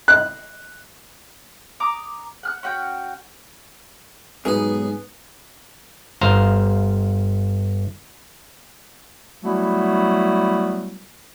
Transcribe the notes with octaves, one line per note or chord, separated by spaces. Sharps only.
F#6
A#5 D6 D#6
F#5 F6 F#6
C#4 F#4 F#5 G5
B1 G#2 B3 G#4 G#5
G1 C5 F5 A#5
F#3 G3 A3 B3 E4 F#4